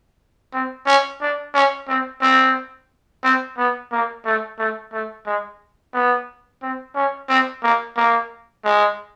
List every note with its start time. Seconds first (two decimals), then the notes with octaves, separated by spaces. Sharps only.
0.53 C4
0.86 C#4
1.21 D4
1.54 C#4
1.88 C4
2.21 C4
3.24 C4
3.57 B3
3.92 A#3
4.25 A3
4.58 A3
4.92 A3
5.26 G#3
5.93 B3
6.62 C4
6.95 C#4
7.29 C4
7.63 A#3
7.97 A#3
8.64 G#3